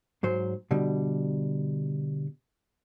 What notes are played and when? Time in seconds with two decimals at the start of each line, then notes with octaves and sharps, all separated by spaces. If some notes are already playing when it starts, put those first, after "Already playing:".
0.23 G#2 F#3 C5
0.71 B2 D3 G3